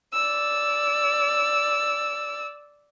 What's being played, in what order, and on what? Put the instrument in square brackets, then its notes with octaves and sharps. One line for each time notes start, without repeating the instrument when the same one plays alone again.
[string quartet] D5 E6